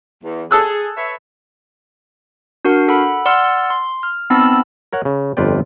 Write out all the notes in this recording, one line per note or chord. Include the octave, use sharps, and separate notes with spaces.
E2
G#4 A4 E6 F#6
B4 C#5 E5
D4 F#4 A#4 F#5
A4 F#5 B5
D5 F#5 C6 E6 F6
C6
F6
B3 C4 D#4 A5 B5 E6
A#4 C#5 F#5
C#3
G1 F2 F4 B4 D5 G5